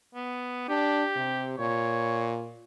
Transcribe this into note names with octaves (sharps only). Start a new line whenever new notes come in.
B3
D4 G4
C3
A#2 C#5